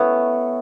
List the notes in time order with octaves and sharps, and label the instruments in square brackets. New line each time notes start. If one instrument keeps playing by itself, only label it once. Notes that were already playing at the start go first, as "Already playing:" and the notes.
Already playing: [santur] A3 C#4 [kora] B3 E4